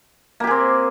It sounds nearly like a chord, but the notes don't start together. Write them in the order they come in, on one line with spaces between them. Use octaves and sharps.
A#3 G4 G#4 C4